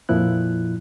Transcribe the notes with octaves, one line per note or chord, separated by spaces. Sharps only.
F2 A#2 F3 E4 F#6